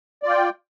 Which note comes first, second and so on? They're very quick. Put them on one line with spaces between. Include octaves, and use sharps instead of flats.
D5 F4 G5